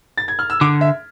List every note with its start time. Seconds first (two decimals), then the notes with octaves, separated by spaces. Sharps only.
0.18 A6
0.28 G#6
0.39 F6
0.50 E6
0.61 D3 D6
0.81 E5